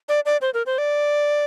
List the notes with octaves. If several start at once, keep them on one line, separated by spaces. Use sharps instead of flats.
D5
D5
C5
A#4
C5
D5